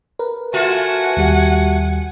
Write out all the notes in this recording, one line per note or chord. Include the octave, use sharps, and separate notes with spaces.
A#4 B4
A3 F4 F#4 F#5 G#5
D#2 G3 G4